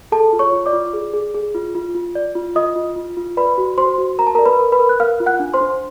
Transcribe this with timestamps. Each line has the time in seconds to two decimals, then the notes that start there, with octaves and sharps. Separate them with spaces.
0.12 G#4 A4 A5
0.33 F4
0.39 C#5 C#6
0.52 F4
0.66 D5 D6
0.73 F4
0.93 G#4
1.14 G#4
1.35 G#4
1.55 F4
1.75 F4
1.95 F4
2.15 D5
2.35 F4
2.55 F4 D#5 D#6
2.76 F4
2.96 F4
3.17 F4
3.37 B4 D5 B5
3.58 F#4
3.78 F#4 C5 C6
3.98 F#4
4.18 A#4 A#5
4.27 A5
4.35 A#4 A#5
4.39 D5
4.46 B4 B5
4.59 A#4
4.72 B4 B5
4.79 A#4
4.89 F#6
5.00 A#4 F5 F6
5.20 F4
5.26 F#5 F#6
5.40 D4
5.54 C5 C6
5.61 D4